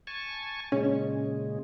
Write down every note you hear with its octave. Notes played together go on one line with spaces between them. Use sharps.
G#5 A5 C#6
A#2 C#3 G#3 C#4